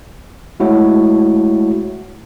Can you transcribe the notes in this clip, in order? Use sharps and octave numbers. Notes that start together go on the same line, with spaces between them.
G#3 A3 E4 F#4 C#5